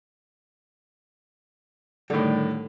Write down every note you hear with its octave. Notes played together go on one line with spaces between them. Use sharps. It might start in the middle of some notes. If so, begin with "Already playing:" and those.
A2 D3 D#3 G3